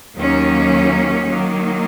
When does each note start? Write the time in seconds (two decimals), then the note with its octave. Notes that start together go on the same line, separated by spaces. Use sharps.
0.16 D#2 D#3 F#3 A#3 C#4
1.27 D#3 F#3 A#3